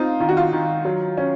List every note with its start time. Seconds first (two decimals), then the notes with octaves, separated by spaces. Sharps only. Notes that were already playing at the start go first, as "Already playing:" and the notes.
Already playing: C4 D#4 F4
0.20 D#3 F4
0.29 F#4
0.37 F4
0.53 D#3
0.85 F#3
1.17 C#4